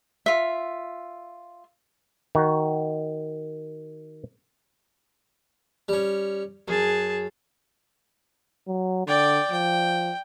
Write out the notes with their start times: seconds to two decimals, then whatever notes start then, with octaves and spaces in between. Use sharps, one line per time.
0.26 F4 E5
2.35 D#3 F#4
5.89 G3 C#4
6.68 F#2 G#4 A5
8.68 F#3
9.07 D3 D5 G5
9.52 F3 G5